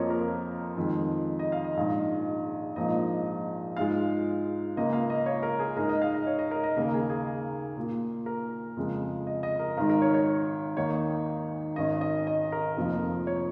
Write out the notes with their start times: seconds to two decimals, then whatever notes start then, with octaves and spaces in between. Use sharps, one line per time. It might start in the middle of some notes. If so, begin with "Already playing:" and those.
Already playing: F2 F3 A#3 F4 C#5 D#5
0.10 A#4
0.77 F2 D#3 G#3
1.39 D#5
1.52 F5
1.64 D#5
1.77 A#1 G#2 G#3 D#4
2.76 A#1 G#2 F3 A#3 D#4 D#5
3.77 G#2 G#3 F4 F5
4.76 C#2 C#3 A#3 D#5
4.93 F5
5.10 D#5
5.26 C#5
5.43 A#4
5.59 G#4
5.77 G#2 G#3 D#4 A#4
5.89 D#5
6.02 F5
6.14 D#5
6.27 C#5
6.39 D#5
6.51 A#4
6.64 D#5
6.77 D#2 C#3 A#3 A#4
6.94 G#4
7.09 G#4
7.77 A#2 A#3 F4
8.26 A#4
8.77 F2 C#3 G#3
9.27 D#5
9.43 D#5
9.59 A#4
9.77 G#1 G#2 D#3 A#4
9.90 A#4
10.02 C#5
10.14 C#5
10.77 D#2 D#3 A#3 D#4 C#5
11.76 G#1 G#2 D#3 C#4 D#5
12.01 D#5
12.27 D#5
12.52 A#4
12.77 F1 F2 F3 A#3 F4
13.27 C#5